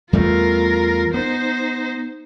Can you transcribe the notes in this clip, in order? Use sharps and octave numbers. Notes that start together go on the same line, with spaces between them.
E2 G3 A3 F4 A#4
B3 D#4 C5